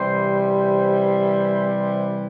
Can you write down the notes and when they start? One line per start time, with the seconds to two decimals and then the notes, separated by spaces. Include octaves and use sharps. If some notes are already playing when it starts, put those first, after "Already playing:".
Already playing: C3 E3 G3 C5
0.47 C5